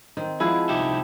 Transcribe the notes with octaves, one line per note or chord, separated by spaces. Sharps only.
D#3 C4
F3 G#3 E4 G#4 F#5 A5
C2 D#4 G4 E5